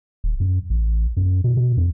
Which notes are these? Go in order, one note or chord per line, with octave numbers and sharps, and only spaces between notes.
D#1
F#2
A1
F#2
B2
B2
F2